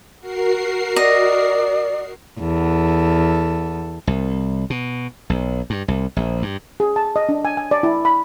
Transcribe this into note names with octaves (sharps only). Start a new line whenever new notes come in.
F#4 A#4 C7
D5 D#5
E2 A4
C2
B2
B1
G2
C2
A#1
G2
G#4
A5
D#5
D4
G#5
G#5
D5
E4
B5